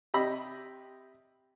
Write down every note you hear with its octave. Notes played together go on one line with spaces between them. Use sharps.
C3 G4 D#5 B5 E6